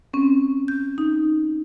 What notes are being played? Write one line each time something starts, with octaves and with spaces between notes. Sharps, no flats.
C4 C#4
G6
D#4